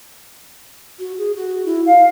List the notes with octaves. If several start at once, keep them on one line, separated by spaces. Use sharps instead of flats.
F#4
G#4
F#4
E4
F5